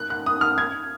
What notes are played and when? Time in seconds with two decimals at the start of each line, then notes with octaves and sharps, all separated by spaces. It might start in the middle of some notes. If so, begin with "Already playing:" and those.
Already playing: F#6
0.10 F#6
0.26 D#6
0.41 F6
0.58 G#6